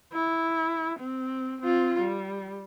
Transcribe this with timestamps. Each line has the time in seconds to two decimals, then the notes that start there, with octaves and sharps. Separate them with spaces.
0.13 E4
0.99 C4
1.61 C4 F4
2.00 G3